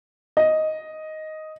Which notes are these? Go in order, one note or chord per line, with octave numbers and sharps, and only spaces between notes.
D#5